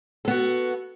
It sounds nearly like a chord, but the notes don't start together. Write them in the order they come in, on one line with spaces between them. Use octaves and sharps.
A4 B3 F#4